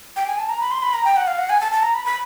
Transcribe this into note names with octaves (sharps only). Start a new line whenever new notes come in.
G5
G#5
A5
A#5
B5
C6
B5
A#5
G5
F#5
F5
F#5
G#5
A5
A5
A#5
B5
B5